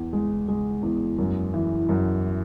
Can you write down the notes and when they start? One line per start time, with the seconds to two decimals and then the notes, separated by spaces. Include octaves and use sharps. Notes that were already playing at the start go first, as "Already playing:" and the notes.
Already playing: E2
0.13 G#3
0.48 G#3
0.83 E2
1.18 F#2
1.54 E3
1.89 F#2